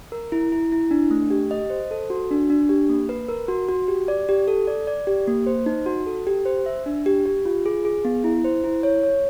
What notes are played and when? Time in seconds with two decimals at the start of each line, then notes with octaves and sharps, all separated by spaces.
0.12 A#4
0.32 E4
0.52 E4
0.72 E4
0.91 D4
1.11 A3
1.30 G4
1.51 D#5
1.70 C5
1.91 A4
2.10 F#4
2.31 D4
2.50 D4
2.69 G4
2.89 A#3
3.09 B4
3.28 A#4
3.48 F#4
3.69 F#4
3.88 G4
4.08 D5
4.29 G4
4.48 A4
4.67 D5
4.87 D5
5.07 G4
5.27 A#3
5.46 C5
5.66 D#4
5.86 F#4
6.06 A4
6.27 G4
6.45 C5
6.66 E5
6.86 D4
7.06 G4
7.26 G4
7.45 F4
7.66 G#4
7.85 G#4
8.05 B3
8.24 E4
8.44 C5
8.64 E4
8.83 C#5
9.03 C#5